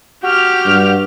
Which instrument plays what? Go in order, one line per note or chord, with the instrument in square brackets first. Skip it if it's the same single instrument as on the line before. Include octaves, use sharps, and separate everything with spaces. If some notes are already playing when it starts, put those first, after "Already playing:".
[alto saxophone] F#4 [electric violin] G4 F6
[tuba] G2